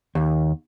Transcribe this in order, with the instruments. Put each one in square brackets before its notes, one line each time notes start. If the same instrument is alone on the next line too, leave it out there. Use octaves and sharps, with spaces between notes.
[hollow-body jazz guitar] D#2